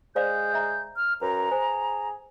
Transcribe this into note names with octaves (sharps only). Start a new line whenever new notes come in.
G#3 C5 D5 F5 G6
E5 A#5
F6
F#2 B4 A#5
G#4 C5